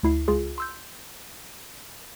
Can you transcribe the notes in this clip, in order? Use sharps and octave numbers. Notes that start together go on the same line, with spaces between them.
D2 E4 C7
C#2 F4 G#4
C6 E6 G6